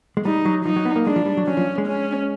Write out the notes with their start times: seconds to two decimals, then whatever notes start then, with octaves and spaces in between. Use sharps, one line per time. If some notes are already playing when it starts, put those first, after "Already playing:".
0.17 G#3
0.25 G3 D#4
0.45 F#3
0.65 F3 D#4
0.76 F#3
0.85 B3
0.96 A#3
1.06 G#3 D4
1.16 F3
1.26 G3
1.37 F#3
1.47 F#3 C#4
1.57 F3
1.78 G#3
1.87 C#4